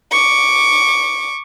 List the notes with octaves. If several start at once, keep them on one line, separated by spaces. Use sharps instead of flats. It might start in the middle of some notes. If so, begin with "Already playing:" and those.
C#6 D6